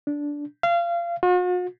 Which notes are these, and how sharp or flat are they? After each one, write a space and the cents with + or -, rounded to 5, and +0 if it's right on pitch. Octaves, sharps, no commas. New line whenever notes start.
D4 -10
F5 -25
F#4 -45